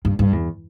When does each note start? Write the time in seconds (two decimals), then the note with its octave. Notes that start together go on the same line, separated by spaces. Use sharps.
0.05 G2
0.19 G2
0.33 E2